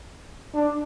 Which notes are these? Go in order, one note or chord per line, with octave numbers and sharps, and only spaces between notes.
D4